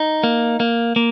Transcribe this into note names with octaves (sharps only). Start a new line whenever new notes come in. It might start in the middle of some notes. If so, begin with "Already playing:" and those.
Already playing: D#4
A#3
A#3
A#3